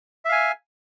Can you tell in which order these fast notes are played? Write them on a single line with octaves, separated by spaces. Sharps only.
E5 F5 G#5